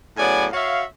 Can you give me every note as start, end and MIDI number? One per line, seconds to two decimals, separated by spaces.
0.17 0.47 45
0.17 0.47 49
0.17 0.47 54
0.17 0.47 59
0.17 0.47 74
0.17 0.47 80
0.52 0.83 66
0.52 0.83 73
0.52 0.83 76
0.52 0.83 77